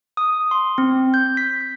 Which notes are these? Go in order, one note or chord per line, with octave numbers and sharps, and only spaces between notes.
D#6
C6
C4
G6
B6